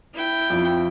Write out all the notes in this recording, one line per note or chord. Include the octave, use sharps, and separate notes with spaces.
E4 G5
F2